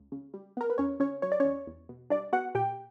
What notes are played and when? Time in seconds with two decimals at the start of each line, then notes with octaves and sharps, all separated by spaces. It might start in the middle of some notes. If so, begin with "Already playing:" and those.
Already playing: C#2
0.12 C#3
0.34 G3
0.57 B3 A#4
0.70 B4
0.78 E2 C#4 C#5
1.00 C#3 C#4 C#5
1.22 F#3 C#5
1.32 D5
1.40 E2 C#4 C#5
1.67 E2
1.89 B2
2.10 G3 D4 D5
2.33 B3 F#4 F#5
2.55 A#2 G4 G5